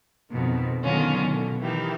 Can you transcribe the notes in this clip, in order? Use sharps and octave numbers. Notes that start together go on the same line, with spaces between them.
F2 B2 D#3
D3 D#3 F#3 B3 C#4 F4
B2 D3
D#3 E3 G4